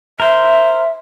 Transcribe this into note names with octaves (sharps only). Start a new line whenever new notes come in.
A#4 C5 E5